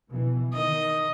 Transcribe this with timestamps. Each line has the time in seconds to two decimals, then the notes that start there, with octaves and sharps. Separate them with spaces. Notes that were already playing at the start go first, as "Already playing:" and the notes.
0.10 B2 E3
0.53 D#3 D#5